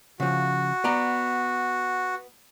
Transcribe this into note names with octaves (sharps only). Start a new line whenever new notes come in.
C#3 F3 F#4
B3 D5 A#5